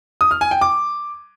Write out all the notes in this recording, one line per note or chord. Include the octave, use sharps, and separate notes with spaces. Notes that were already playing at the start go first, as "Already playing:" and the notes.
D#6
F6
G#5
G5
D6